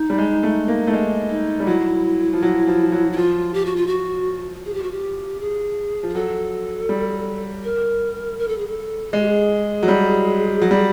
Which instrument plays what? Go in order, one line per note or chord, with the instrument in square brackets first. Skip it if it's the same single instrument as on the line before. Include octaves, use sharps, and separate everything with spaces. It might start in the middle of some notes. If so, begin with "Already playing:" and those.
Already playing: [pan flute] D#4
[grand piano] G3
G#3
A3
A#3
A3
G#3
[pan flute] D#4
[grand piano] G3
[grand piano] F#3 [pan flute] E4
[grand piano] F3
F#3
F3
F#3
[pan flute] E4
[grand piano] F3 [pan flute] F4
[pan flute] G4
F#4
F4
F#4
G#4
G4
F#4
G4
G#4
[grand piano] F3
[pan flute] G#4
[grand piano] F#3 [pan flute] A4
[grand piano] G3
[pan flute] A#4
A#4
A4
G#4
A4
[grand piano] G#3 [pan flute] G#4
[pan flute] G4
G#4
[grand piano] F#3
G3
F#3
G3